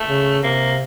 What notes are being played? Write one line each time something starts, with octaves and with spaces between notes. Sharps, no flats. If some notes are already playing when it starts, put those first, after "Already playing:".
Already playing: A3
C#3
C3 A#3